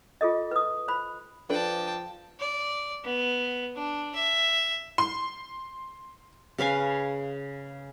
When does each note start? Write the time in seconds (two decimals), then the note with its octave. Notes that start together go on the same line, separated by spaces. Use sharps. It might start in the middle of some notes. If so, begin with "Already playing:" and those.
0.21 F4 G#4 A4 D#5
0.51 B4 D#6
0.88 C5 B5
1.50 F3 D4 A4 B4 G5 A5
2.39 D5
3.04 B3
3.75 D4
4.15 E5
4.98 C6
6.58 C#3 B4 F5 G#5